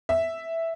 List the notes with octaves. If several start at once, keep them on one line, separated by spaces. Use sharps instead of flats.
E5